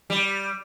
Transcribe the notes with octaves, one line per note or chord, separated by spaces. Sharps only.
G3